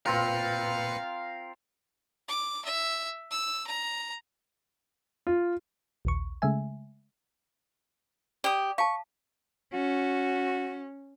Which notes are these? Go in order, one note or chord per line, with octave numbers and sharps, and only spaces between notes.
A#2 C4 F4 A#4 B4 F5 G5 C#7
D6
E5
E6
A#5
F4
A#1 D#2 C#6
C#3 G#3 A3 E5 G#5
G4 D5 D#6
F5 A5 C#6
C#4 F#4